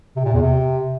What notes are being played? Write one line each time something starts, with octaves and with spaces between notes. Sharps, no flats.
C3
A#2
E2
C3